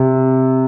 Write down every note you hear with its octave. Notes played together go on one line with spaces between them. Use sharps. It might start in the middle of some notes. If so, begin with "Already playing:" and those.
Already playing: C3